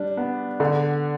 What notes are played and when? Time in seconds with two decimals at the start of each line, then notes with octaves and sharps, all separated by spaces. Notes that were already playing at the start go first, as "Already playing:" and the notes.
Already playing: G3 D4
0.17 B3
0.60 D3